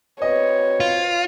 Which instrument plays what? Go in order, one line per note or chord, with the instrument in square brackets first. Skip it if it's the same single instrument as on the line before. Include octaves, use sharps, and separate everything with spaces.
[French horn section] C4 F#4 B4 [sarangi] C#5 [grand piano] D#5
[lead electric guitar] F4